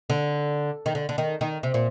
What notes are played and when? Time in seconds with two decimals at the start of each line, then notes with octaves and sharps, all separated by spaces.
0.10 D3
0.86 D#3
0.95 D3
1.09 D3
1.18 D#3
1.41 D#3
1.63 C3
1.74 A#2